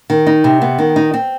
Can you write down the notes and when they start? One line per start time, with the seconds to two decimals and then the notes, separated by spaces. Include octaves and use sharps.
0.10 D#3
0.26 D#4
0.44 C3
0.61 B3
0.78 D#3
0.96 D#4
1.14 C4